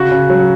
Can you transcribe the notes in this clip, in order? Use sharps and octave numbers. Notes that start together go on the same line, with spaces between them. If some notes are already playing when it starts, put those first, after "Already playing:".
Already playing: C#3 F#4
C#3
F#3